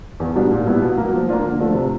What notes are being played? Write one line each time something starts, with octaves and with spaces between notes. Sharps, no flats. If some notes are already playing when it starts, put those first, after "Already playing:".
E2
B2 G3 A#3 D4
A#2
G3 B3 E4
B2
F#3 A#3
F3
A#3 D4 F4
D3
F3 A3 D4
C3